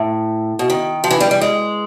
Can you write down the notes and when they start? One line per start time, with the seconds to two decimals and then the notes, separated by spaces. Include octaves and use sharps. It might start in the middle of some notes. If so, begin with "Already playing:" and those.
Already playing: A2
0.59 B2
0.70 D#3
1.04 F3
1.11 E3
1.20 G3
1.31 G3
1.41 G#3